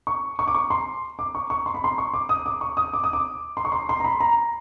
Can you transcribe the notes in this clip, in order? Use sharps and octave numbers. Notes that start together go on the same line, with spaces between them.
C#6
C#6
D6
C#6
C6
D6
C#6
C#6
C6
B5
C6
C#6
D6
D#6
D6
C#6
D#6
D6
D#6
D6
C6
C#6
C6
C6
A#5
B5
A#5